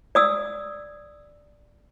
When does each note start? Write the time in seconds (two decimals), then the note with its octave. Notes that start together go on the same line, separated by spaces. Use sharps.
0.15 D5 D#6 E6